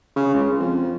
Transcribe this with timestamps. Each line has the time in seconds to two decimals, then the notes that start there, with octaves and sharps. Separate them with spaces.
0.16 C#3
0.35 C#2
0.60 F2